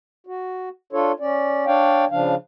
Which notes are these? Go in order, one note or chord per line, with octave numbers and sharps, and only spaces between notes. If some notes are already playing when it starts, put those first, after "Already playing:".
F#4
D4 F4 A4 C#5
C#4 D5
D4 C#5 D5 F5 G5
C#3 F3 D4 F5